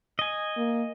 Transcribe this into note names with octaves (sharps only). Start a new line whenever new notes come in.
D#5 G#5
A#3